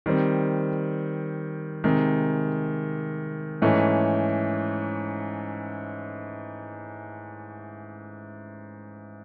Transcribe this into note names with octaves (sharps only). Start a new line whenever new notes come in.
D#3 G3 C4
C3 D#3 G#3
G#2 E3 A3 C#4